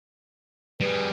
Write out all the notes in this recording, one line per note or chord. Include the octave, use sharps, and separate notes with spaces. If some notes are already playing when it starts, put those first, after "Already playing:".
G3 G#4 B4